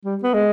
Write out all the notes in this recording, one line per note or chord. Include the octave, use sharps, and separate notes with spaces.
G3
B3
G#3